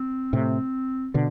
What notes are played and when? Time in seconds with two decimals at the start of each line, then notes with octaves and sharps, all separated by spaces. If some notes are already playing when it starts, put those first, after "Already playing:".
Already playing: C4
0.33 A2 C3 C4
1.14 B2 D3